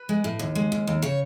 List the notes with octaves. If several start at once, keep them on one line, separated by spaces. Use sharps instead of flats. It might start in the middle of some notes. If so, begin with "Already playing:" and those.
Already playing: B4
G#3
A2
D#2
G#3
D#2
D#2
C#3 C#5